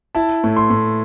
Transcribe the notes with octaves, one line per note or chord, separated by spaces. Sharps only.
E4 A5
A2
C6
A2